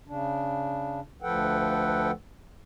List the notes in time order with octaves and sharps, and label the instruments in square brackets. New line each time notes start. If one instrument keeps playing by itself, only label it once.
[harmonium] C#3 D4
D2 F3 A4 B4 F#5 G5